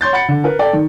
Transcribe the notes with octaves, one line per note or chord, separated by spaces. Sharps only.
C#5 C6 G6 A6
F#5 B5 A6 C#7
D3
A#4 B4
A4 D5 G5
D#3